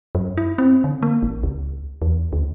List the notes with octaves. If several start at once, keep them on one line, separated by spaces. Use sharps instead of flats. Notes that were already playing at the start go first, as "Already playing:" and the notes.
F#2
E4
C4
D3
A#3
A1
C#2
E2
D2